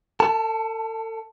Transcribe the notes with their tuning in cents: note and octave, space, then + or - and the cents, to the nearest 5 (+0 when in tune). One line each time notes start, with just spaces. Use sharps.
A4 +40 A5 +0